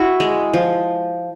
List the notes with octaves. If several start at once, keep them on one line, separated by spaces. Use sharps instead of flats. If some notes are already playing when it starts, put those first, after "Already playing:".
Already playing: E4 F#4
G#3
F3